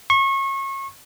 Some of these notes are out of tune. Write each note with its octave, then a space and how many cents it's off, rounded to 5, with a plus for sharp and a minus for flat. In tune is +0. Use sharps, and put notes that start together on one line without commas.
C#6 -30